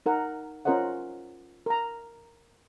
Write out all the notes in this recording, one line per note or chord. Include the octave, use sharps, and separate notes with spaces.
D#4 A#4 F#5
C#4 F4 A#4 C5 D#5 F#5
A#4 A#5